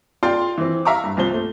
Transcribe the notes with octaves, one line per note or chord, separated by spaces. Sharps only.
F4 D5 F5 G5 C6
E3 C4
E5 F5 A#5 C#6 D6
G2
C2 F3 C5 G7
A3